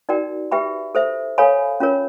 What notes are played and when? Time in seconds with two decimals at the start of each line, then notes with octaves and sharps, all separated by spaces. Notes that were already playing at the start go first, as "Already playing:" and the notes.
0.09 D#4 F#4 A#4 D5 G5
0.51 G4 B4 E5 G5 B5
0.95 A4 C5 E5
1.38 A4 C#5 F5 G#5 B5
1.80 C#4 F4 A#4 C#5